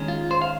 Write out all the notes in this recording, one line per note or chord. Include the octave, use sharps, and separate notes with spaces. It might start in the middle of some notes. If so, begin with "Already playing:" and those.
Already playing: D#3 G#3 C#4
F4
C5
F5